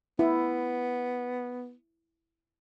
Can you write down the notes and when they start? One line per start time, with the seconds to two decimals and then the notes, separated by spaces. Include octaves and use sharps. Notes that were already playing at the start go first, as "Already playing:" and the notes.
0.19 B3 E4